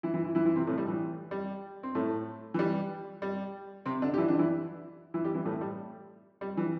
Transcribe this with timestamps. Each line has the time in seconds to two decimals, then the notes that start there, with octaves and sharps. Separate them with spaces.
0.03 E3 E4
0.14 E3 E4
0.24 E3 E4
0.35 E3 E4
0.45 E3 E4
0.56 C3 C4
0.67 A2 A3
0.78 G3
0.88 E3
1.31 G3
1.83 C4
1.95 A2 A3
2.54 E3
2.59 G3
3.22 G3
3.86 C3 C4
4.02 D3 D4
4.14 G4
4.18 E3 E4
4.28 D3 D4
4.39 E3 E4
5.14 E3 E4
5.24 G3 G4
5.34 E3 E4
5.45 A2 A3
5.61 G3
6.41 G3
6.57 E3